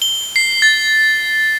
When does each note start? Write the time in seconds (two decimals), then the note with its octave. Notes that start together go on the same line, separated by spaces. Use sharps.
0.02 G7
0.36 C7
0.62 A6